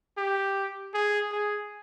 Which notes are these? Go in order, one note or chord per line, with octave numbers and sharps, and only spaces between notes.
G4
G#4
G#4